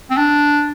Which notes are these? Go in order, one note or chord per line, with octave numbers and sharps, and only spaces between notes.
C4
D4